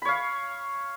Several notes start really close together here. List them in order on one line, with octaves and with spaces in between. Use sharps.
B5 C#5 F5